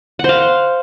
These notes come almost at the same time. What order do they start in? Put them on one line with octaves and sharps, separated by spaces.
F#5 C5 F5